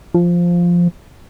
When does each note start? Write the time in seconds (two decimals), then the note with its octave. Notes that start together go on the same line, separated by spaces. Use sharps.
0.14 F3